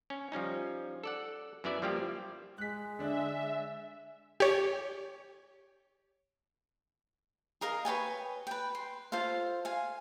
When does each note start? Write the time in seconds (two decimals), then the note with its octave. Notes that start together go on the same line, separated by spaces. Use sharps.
0.10 C#4
0.32 F3 G3 C#4 D#4
1.04 A4 D5 F#5
1.64 F#2 B3 E4 D5 E5
1.82 F3 G3 A#3 F4 G4
2.58 G#3 F#6 B6
2.99 D3 D4 E5
4.40 G4 C#5
7.61 G#4 A#4 D#5 F5
7.85 B4 C#5 G5 G#5
8.47 B4 G5
8.75 C6
9.12 F4 A4 C5 F5
9.65 F5 G#5